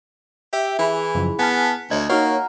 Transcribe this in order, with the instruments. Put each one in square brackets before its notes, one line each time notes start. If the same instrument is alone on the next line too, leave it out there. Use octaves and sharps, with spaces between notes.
[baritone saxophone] G4 [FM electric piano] E5
[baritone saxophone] E3 [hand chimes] E4 G#4 B5
[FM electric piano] F#2 C#3 F3
[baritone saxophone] B3 [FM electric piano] G#5 A5 F6
[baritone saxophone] D2 [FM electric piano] C#5 G#6 [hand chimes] D#5
[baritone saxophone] A#3 [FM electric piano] D#4 F#4 C#5 [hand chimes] F#5 A#5 F6